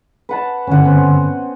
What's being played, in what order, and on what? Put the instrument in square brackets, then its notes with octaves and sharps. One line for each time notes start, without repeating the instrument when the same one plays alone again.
[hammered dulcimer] B4 F#5 A5
[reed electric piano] G2 D3 [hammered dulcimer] C#4 F#5
[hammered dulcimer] B3 C4